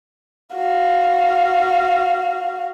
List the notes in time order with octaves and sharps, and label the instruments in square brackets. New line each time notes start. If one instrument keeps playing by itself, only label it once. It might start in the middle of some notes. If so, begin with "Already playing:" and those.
[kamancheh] F#4 F5